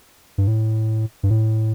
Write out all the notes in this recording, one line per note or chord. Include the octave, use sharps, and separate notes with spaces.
G2
A2
G2
A2